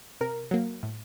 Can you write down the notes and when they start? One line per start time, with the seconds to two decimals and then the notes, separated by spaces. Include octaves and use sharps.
0.21 C3 A#4
0.51 F#3 A#3
0.83 A2